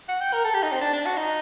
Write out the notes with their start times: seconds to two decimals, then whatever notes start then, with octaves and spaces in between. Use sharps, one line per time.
0.08 F#5
0.21 G5
0.33 A#4
0.45 A4
0.54 G4
0.63 D#4
0.72 C4
0.81 D4
0.93 D4
1.05 F#4
1.17 D#4